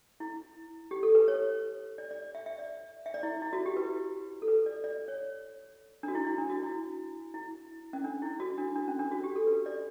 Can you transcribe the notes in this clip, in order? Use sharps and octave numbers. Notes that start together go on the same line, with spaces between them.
E4
G4
A4
B4
C#5
D5
D5
D5
E5
E5
D5
E5
D5
E4
E4
F#4
G4
B4
A4
B4
D5
D5
C#5
D4
F#4
E4
E4
D4
F#4
E4
E4
C#4
D4
E4
F#4
D4
D4
C#4
D4
F#4
G4
A4
B4
D5